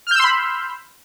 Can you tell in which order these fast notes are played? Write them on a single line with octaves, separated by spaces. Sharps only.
F6 G6 E6 C6 B5